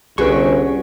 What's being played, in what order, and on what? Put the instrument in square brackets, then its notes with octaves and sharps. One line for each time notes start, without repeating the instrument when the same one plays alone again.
[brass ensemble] G1 [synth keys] C2 B4 [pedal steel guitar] C#4 C#6 [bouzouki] F#4 G#4 G5